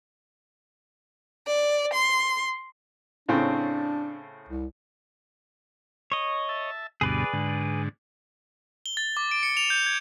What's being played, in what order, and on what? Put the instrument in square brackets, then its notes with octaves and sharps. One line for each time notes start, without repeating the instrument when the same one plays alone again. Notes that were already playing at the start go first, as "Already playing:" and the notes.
[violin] D5
C6
[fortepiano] A2 C#3 C4 [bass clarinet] D4
[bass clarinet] C2
[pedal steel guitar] C#5 D#5
[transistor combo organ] E5 A5
[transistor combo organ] D2 G2 B2 [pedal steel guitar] G#4 B4 D5
[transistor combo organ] G#2 D3
[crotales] G7
A6
D6
D7
C#7
F7
G6
G#6